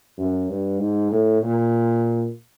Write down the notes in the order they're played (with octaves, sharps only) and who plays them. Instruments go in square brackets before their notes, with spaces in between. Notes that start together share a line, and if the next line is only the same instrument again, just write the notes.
[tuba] F#2
G2
G#2
A2
A#2